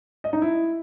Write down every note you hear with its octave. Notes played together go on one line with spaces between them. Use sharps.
D#5
D#4
E4